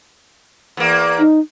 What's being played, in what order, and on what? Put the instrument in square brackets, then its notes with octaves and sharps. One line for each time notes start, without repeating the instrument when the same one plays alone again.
[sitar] E2 A#3
[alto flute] D#4